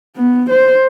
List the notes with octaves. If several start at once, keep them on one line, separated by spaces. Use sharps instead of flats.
B3
C5